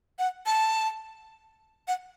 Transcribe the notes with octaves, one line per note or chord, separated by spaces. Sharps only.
F#5
A5
F#5